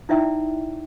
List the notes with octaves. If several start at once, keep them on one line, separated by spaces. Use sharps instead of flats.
D#4 E4 D5 E5 G5